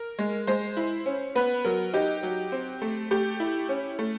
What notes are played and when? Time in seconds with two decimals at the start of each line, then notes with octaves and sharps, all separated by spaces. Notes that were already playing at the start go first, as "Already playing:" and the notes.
Already playing: A#4
0.19 G#3
0.47 G#3 C5
0.77 E4
1.06 C#4
1.35 B3 B4
1.65 F#3 A#4
1.94 D#4 G4
2.23 F#3
2.52 C4
2.82 A3
3.11 A3 G4
3.40 E4
3.69 C#4
3.99 A3